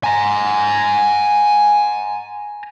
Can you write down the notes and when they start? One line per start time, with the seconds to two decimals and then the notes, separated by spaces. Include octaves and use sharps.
0.04 G#5 A#5